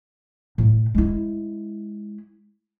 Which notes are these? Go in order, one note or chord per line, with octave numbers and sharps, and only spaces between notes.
A2
G#3 E4